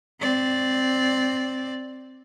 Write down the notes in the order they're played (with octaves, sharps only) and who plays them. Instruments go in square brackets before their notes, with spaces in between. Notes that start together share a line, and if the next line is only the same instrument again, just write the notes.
[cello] C4 D5